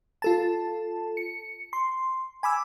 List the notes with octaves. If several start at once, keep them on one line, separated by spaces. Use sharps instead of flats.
F4 A4 A5
C#7
C6
G#5 B5 D6 E6